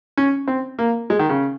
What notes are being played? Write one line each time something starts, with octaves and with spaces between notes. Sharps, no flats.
C#4
C4
A#3
G#3
D#3
C#3